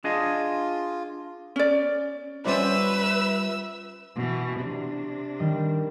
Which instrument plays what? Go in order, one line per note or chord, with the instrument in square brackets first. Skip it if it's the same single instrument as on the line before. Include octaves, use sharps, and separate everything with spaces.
[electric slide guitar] D4 G#4 D#5 [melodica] F4
[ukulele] C#4 D5
[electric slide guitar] G3 F4 [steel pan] C#4 C5 D5 [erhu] B4 [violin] E5 E6
[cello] B2 E3
C3 D4
[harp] D#3 G3 D#5